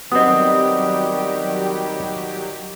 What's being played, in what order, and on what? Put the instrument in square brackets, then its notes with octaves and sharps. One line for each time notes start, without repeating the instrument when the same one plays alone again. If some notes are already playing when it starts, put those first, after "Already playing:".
[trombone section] D#3 G3 [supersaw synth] F#3 G4 [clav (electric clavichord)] B3 C4 [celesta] D#5 D#6